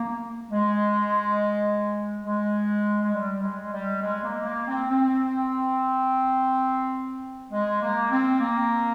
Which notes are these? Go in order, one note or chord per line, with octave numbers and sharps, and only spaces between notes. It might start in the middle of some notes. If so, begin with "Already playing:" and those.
Already playing: A#3
G#3
G#3
G#3
G3
G#3
G3
G#3
A#3
A#3
C4
C4
G#3
A#3
C4
A#3